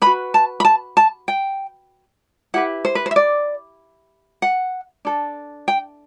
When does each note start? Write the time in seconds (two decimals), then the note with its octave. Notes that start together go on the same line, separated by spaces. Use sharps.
0.02 F#4 B4 B5
0.34 A5
0.60 B5
0.65 A5
0.97 A5
1.28 G5
2.54 E4 G4 B4 F#5
2.85 C5
2.95 B4
3.06 C5
3.11 E5
3.16 D5
4.42 F#5
5.05 D4 A4
5.68 G5